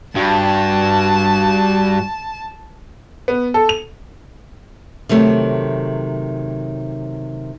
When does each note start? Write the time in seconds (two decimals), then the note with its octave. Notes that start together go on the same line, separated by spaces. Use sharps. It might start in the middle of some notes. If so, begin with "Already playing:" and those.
0.16 G2 F#4 A5
3.28 B3
3.54 A4
3.69 F7
5.09 C3 D#3 F#3 A3